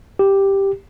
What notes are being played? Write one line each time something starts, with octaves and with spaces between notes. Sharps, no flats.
G4